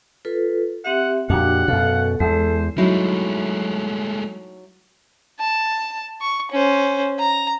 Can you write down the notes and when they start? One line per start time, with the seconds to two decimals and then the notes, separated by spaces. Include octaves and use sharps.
0.25 F4 A4 B4
0.85 C4 G4 E5 F#5
1.30 F2 A#2 D4 F#4 G4 F#5
1.68 F#2 B2 A4 F5
2.20 E2 G#3 A4 C5
2.78 F#3 G#3 A3 D#4 E4
5.40 A5
6.21 C#6
6.51 C#4 C5
7.19 A#5